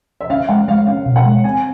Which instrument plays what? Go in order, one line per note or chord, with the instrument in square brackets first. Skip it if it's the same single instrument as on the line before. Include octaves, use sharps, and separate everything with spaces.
[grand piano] E5
[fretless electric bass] C#4 [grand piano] F5
[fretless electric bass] G#3 [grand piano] F#5
[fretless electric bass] G#3 [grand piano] F5
[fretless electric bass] C#4 [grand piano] F5
[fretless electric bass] B2
[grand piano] F#5
[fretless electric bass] G#3
[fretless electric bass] C4 [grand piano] G#5